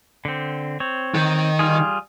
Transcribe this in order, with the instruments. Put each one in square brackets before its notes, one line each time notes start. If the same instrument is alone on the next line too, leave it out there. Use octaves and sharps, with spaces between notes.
[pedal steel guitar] D3 C4
C4 C#5
[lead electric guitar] D#3
[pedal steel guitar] G3 F4 G#4